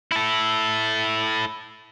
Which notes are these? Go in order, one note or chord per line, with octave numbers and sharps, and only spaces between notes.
E4 A4